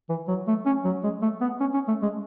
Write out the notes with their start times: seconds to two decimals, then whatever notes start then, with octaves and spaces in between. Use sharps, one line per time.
0.09 E3
0.28 F#3
0.47 A3
0.66 C#4
0.84 F#3
1.03 G#3
1.22 A3
1.41 B3
1.60 C#4
1.74 C#4
1.88 A3
2.02 G#3